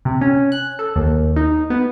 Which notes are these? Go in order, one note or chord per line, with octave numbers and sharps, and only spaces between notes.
C3
C#4
F#6
A4
D#2
D#4
B3